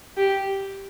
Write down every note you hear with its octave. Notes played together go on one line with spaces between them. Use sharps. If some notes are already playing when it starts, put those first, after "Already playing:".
G4